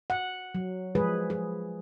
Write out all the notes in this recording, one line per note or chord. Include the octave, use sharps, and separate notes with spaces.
F#5
F#3
F3 G#3 G#4 B4
G#4